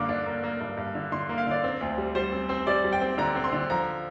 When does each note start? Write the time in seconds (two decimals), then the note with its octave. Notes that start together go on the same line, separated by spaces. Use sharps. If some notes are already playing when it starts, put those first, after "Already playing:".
Already playing: G2 D3 A#3 D6
0.09 D4
0.26 A#3
0.44 A#3
0.60 G2
0.77 G2
0.95 D3
1.12 D3 C6
1.29 A#3
1.38 F5
1.47 D3 D5
1.64 C4
1.81 D2
1.98 G3
2.15 G3 C5
2.32 C4
2.49 C4
2.67 G3 D5
2.84 G3
2.93 G5
3.01 C4
3.18 D3 A#5
3.35 C4
3.44 C6
3.53 D3
3.70 F3 A#5